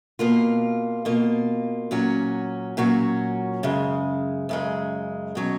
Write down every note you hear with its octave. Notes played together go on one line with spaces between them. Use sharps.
B2 A#3 F4
B2 A#3 F4
A#2 F#3 C#4 F#4
A#2 F#3 C#4 F#4
F#2 C#3 G#3
F#2 C#3 G#3
B2 F#3 C#4